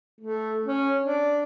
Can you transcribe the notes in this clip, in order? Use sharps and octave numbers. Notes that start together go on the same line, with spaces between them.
A3
C#4
D4